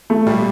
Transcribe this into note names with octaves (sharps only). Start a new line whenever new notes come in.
A3
A#2 G3